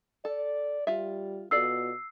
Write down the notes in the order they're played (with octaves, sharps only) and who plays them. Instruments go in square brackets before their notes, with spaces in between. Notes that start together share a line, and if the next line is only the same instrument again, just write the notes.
[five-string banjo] A4 [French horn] D5
[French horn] G3 [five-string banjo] F4 E5
[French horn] B2 [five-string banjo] F4 A4 D5 [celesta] E6 C7